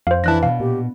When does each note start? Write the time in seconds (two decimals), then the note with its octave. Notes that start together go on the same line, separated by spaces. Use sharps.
0.07 F2 C5 F5
0.24 E3 D4 E4 A5 F#6 A#6
0.43 B2 F5
0.60 A#2 G4